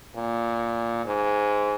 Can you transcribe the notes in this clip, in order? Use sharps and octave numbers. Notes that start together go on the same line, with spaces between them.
A#2
G#2